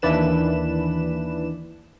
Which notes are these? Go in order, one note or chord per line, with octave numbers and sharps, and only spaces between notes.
D#2 E3 D4 B4 E7